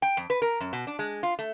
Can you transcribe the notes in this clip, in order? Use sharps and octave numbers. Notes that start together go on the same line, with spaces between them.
G5
F2
B4
A#4
F#2
B2
D4
G#3
F4
A3